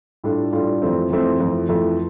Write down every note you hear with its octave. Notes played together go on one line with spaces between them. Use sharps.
A2 G3 D4 F4 A4
A2 G3 D4 F4 A4
F2 E3 A3 C4
F2 E3 A3 C4
F2 E3 A3
F2 E3 A3